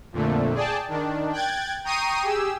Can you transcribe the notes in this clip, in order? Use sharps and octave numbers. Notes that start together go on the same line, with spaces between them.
F2 A#2 D3 A3
G#4 D5 G5 A5
D#3 D4
G5 F#6 G#6 A6
G5 A#5 C#6 D#6 C7 D#7
G4 G#4 E6